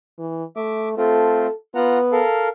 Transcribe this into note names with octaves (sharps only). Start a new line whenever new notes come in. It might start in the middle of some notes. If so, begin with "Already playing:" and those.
E3
A3 E5 D6
A3 C4 F4 A4
B3 F4 F#5 A#5
A4 A#4 F5